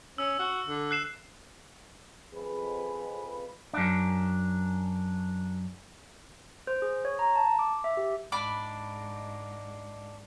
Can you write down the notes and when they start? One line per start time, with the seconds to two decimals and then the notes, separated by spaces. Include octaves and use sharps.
0.18 C#4 E6
0.39 F#4
0.67 D3
0.91 F#6 C7 E7
2.34 F2 G#4 B4
3.73 F#2 D4
6.67 C5
6.82 G#4
7.05 C#5
7.19 A#5
7.36 A5
7.59 D6
7.84 E5
7.97 G4
8.32 G#2 G#3 D4 B5 D6